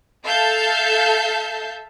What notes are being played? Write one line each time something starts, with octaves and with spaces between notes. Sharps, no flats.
A4 E5 F5 A5 G6